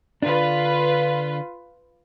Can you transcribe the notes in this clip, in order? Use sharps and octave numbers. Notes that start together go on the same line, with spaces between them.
D3 D4 F4 B4